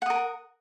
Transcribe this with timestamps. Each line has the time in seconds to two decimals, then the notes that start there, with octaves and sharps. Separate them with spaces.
0.02 F#5
0.06 D#6
0.10 A#4